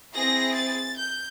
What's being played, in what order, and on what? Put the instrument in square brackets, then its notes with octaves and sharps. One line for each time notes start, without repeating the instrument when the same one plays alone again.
[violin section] C4 E4 G#4 A#6
A6
G6